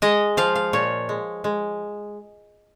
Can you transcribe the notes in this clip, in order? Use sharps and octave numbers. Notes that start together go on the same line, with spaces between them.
G#3 D#5
F3 F5
F5
A#2 C#5
G#3
G#3